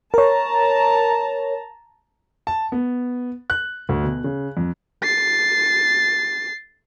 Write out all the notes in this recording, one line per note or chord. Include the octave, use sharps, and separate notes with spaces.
A#4 C#5 A5 A#5
A5
B3
F#6
D2
B2
C#3
F2
A6 C7